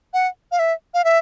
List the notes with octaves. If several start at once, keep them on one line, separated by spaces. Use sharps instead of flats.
F#5
F5
E5
F5
E5